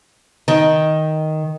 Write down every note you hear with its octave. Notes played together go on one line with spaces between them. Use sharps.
D#3